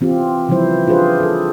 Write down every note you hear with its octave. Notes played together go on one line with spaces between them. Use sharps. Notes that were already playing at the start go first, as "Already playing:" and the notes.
E3 C4 F4 G4
C#3 E3 F3 G3 E4 C5
D4 F4 G4 G#4 B4 C5
G#4 A4